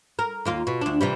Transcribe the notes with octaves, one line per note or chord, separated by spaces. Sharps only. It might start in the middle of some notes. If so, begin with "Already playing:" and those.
A#4
D#2 A#3 F4
B2
D2 D4
C3 E3 G3